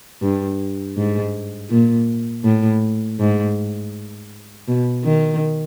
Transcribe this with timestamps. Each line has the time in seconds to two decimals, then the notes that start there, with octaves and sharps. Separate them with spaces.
0.22 G2
0.97 G#2
1.70 A#2
2.44 A2
3.20 G#2
4.68 B2
5.04 D#3